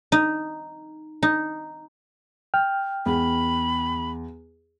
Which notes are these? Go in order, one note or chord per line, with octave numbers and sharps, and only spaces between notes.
D#4
D#4
G5 F6
E2 B5